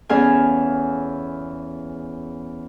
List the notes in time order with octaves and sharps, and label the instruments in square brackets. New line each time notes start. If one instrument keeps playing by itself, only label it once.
[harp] E2 C#4 G#4 A4 F5 G#5